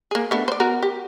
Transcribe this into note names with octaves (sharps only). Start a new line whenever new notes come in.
A#3 G#4
A3 B3 D4
C5 D5
B3 F#4 A#4
G4